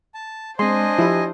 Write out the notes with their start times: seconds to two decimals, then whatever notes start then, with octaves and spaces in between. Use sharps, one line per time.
0.14 A5
0.59 G#3 C4 D4 C5 D#5 G#5 C6
0.99 F3 E4 G4